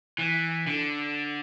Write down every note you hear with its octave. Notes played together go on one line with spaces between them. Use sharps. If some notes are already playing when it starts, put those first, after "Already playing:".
E3
D3